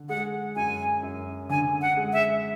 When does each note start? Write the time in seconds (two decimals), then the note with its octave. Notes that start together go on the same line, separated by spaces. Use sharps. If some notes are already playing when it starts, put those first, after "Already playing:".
Already playing: D3
0.09 G#3 F#5
0.56 F#2 G#5
1.03 F#2
1.49 D3 G#5
1.82 F#5
1.97 G#3
2.13 E5